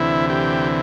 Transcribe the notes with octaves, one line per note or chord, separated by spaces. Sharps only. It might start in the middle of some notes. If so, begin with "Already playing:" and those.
Already playing: D2 C3 E3 E4
G4